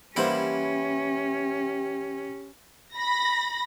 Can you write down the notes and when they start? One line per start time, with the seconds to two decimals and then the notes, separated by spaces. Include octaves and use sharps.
0.16 E3 G3 A#3 C#4 E4 G4 C5 F#5
2.95 B5 A#6